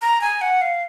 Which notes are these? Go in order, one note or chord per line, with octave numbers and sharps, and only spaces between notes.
A#5
G#5
F#5
F5